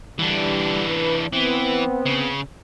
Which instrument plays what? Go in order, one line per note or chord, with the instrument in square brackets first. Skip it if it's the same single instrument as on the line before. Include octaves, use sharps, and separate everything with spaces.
[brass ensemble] D3 G3 [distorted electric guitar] E3 D4
[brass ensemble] B4
[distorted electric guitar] E3 [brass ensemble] B3 C4
[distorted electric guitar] C#3